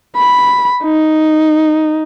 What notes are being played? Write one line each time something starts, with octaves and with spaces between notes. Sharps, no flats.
B5
D#4